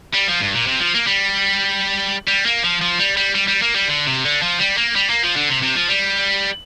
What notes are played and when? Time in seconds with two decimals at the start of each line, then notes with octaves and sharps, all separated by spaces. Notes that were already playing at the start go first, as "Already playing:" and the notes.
0.14 G3
0.27 F3
0.40 G2
0.54 A#2
0.67 C3
0.80 F3
0.95 A#3
1.07 G3
2.27 G3
2.46 A#3
2.63 F3
2.81 F3
2.99 G3
3.17 G3
3.35 G3
3.48 G3
3.62 A#3
3.75 G3
3.88 D3
4.07 C3
4.25 D3
4.42 F3
4.59 G3
4.78 A#3
4.96 G3
5.09 A#3
5.23 F3
5.36 D3
5.49 C3
5.62 C3
5.76 F3
5.89 G3